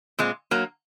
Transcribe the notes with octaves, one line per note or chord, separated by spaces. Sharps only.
A#2 G#3 C4
F#3 A#3